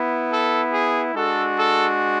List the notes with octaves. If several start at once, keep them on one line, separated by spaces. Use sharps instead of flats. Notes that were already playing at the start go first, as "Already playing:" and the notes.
Already playing: B3 E4
A4
G#4
G#3 D4 F#4 A4
A4